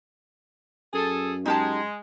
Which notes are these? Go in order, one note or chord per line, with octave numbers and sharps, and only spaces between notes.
F#2 G#4 A4
G#3 D#4 G4 A5